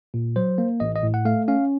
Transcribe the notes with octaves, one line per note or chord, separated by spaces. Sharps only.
A#2
F#3 C5
A#3
A1 D#5
D#5
A2
F#5
A3 F5
C#4 F5